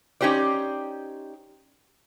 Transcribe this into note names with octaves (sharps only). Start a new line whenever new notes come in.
C#4 D#4 G4 C5 D5